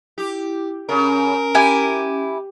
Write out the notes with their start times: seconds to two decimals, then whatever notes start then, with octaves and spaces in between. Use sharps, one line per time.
0.18 E4 G4
0.89 C#3 C#4 A#4
1.55 E4 G4 G#5